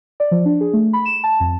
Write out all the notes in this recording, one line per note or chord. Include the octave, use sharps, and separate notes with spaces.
D5
F3
D4
G#4
A3
B5
E7
A5
F2